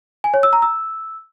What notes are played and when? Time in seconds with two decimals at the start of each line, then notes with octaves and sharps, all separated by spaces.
0.24 G#5
0.34 C#5
0.43 E6
0.53 A#5
0.62 E6